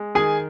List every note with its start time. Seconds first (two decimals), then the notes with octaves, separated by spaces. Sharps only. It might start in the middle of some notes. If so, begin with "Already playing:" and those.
Already playing: G#3
0.15 D#3 G#4 G#5